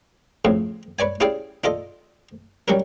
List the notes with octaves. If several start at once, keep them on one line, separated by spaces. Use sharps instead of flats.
F2 A2 C#3
B4 C#5 D5 G#5
C#4 E4 G4 G#4 D5 F5
D4 F4 A4 D#5
F#3 G3 C#4 D4 A#4